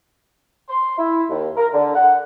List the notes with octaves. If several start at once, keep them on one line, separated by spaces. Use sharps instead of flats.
C6
E4
D#2
A#4
D3
F#5